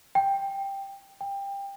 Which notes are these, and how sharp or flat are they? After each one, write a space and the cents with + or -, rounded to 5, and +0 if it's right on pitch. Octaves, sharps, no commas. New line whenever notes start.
G5 +5
G5 +20